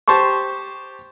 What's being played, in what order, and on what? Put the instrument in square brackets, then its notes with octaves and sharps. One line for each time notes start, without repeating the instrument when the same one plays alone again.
[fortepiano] G4 C5 A5 C6 C#6